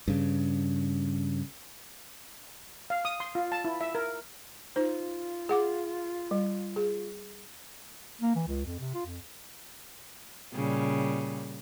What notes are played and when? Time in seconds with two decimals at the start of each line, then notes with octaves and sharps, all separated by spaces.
0.08 G2 C#3
2.90 F5
3.05 D#6
3.20 C6
3.35 F4
3.52 A5
3.65 E4
3.81 E5
3.95 A#4
4.76 D#4 F4 C5
5.49 G#4 F#5 D6
6.31 G3
6.76 G#4
8.21 A#3
8.36 E3
8.48 C#2
8.65 F2
8.80 C3
8.94 F4
9.06 F2
10.52 A#2 C#3 G3